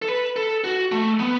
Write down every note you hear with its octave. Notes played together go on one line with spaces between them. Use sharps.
A4
B4
A4
F#4
A3
B3